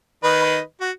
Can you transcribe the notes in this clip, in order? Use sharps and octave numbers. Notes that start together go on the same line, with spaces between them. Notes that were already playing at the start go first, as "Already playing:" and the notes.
D#3 B4 D#5
F#4